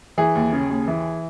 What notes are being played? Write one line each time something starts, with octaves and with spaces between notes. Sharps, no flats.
E3 G#4
D#2
C#3
D#2
E3